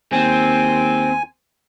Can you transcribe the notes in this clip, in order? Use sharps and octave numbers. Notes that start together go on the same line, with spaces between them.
D#2 C4 G#5